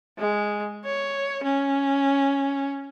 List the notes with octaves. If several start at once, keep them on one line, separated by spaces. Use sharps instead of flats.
G#3
C#5
C#4